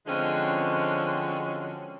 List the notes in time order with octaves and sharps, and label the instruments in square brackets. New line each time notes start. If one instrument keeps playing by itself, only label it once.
[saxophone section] D3 F3 F#3 G#3 C4 C#4